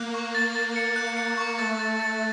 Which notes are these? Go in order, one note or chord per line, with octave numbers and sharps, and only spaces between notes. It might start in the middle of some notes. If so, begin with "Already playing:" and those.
Already playing: A#3 F#6
C#6
A6
A6
C#7
F#6
C#7
C#6
A3 A6
A6
A6